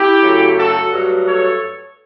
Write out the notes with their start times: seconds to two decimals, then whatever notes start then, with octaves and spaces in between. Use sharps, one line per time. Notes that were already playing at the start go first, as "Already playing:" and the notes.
Already playing: E4 G4
0.22 F#2 C#3 F#3 A3
0.56 F#4 A4
0.91 G2 F#3 A3
1.25 A4 C#5